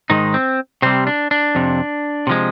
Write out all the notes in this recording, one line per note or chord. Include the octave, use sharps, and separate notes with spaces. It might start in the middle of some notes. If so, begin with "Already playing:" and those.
G#2 D#3 G#3 D#4
C4
C3 G3 C4
D4
D4
F2 C3
C3 F3 G#3